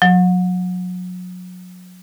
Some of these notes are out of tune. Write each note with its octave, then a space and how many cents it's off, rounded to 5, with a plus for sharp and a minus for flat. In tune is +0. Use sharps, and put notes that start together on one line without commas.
F#3 -35